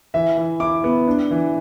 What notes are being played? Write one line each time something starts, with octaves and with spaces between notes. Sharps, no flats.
E3 E5
E3
E4 D6
B3
D4
E3